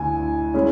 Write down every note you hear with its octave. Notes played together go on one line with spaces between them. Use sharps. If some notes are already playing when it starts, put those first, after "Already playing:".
Already playing: D2 D3 E4 G#5
G#3 C#4 E4